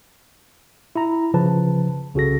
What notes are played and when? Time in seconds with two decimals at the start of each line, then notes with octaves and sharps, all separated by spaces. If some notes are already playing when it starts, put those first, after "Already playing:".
0.96 E4 A#5
1.34 C#3 F3 B4 A5
2.14 C2 C#3 F#4 A4 A#6